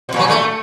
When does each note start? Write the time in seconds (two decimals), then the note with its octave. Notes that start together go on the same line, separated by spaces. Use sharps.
0.09 B2
0.14 A#2
0.19 F#3
0.24 A#2
0.30 A3